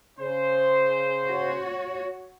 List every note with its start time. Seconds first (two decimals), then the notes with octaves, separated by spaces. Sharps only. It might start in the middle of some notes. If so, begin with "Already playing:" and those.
0.20 C#3 C5
1.25 F#4 C#5